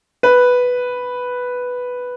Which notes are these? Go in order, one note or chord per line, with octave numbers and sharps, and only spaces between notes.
B4